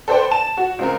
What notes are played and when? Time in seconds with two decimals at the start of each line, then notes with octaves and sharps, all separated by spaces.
0.08 A4 B4 C5 D5 G5
0.31 A5 E7
0.57 F#4
0.79 C#2 C4 A#4